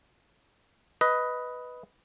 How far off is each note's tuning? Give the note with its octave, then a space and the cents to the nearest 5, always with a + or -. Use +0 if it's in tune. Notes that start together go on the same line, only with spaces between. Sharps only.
B4 +0 D#5 +10